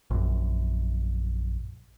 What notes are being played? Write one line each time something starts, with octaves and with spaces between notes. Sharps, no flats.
A#1 F#2